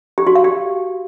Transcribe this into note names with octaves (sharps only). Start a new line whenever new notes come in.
G4
F#4
F5
G4